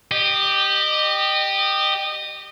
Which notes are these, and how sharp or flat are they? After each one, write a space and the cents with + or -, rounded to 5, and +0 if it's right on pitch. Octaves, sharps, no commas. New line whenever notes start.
G4 +0 D#5 -25